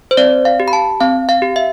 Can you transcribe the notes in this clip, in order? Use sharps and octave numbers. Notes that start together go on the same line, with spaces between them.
C5
C4 D5
F5
G4
B5
A5
C4 F5
F5
G4
E5